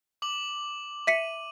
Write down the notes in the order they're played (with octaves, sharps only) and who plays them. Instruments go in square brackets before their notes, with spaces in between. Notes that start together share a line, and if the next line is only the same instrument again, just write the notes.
[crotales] D6 F#7
[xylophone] E5 B6 C#7 [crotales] D#7